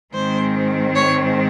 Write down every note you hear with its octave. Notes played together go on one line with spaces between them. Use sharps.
G#2 D#3 G#3 C4 C5
C#5